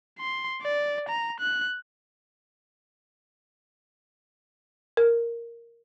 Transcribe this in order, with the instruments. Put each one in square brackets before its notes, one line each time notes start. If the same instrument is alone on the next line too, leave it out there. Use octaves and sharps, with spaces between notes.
[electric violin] C6
D5
A#5
F#6
[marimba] A#4